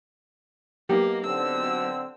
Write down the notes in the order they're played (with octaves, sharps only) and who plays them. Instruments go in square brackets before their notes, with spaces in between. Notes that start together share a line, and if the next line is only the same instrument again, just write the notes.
[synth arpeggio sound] F#3 B3 D#4 [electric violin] A#3 [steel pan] G4
[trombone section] D3 C4 [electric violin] E6